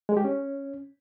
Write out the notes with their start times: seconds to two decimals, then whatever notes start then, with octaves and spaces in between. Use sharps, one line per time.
0.09 G#3
0.17 G4
0.25 C#4